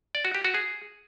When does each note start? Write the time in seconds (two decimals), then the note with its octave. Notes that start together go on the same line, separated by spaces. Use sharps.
0.15 D5
0.25 F#4
0.35 G4
0.45 F#4
0.54 G#4